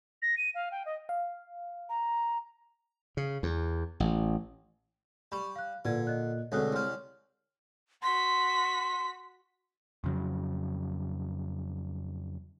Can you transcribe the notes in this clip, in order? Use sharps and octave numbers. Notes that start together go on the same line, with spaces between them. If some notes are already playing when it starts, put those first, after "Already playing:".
A#6
D#7
F5
G5
D#5
F5
A#5
C#3
E2
A1
G3 B5 C#6
F5 F#6
A#2 D3 B4 G#6
D#5 F#6
D2 B2 G#3 C4 C#5 D5 D#6 F#6
C2 G3 C#5 C6 F6
F#4 C6 B6
F2 C#3 F#3